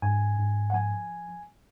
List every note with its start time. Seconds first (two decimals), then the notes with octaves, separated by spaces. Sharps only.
0.02 G#2 G#5
0.38 G#2
0.70 F#5
0.73 F3 G#5